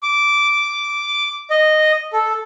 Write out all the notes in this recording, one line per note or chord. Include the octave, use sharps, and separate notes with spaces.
D6
D#5
A4